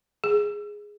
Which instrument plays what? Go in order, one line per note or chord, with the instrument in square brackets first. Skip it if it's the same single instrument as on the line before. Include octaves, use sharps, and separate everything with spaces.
[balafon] G#4